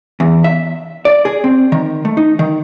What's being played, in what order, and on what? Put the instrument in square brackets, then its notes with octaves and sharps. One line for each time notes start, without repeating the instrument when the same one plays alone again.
[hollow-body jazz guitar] E2
E5
D5
G#4
C4
D#3
A3
D#4
D#3